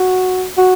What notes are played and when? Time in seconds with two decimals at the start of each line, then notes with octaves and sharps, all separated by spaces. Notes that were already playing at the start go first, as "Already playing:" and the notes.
Already playing: F#4
0.57 F#4